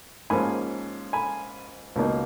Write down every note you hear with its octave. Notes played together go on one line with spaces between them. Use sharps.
G#2 F3 A#3 C#4 G#5 B5
G#5 B5
C#2 B2 A#3 D#4